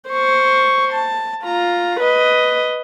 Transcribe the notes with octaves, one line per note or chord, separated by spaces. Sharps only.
C5 C#6
A5
F4 A#5
B4 D#5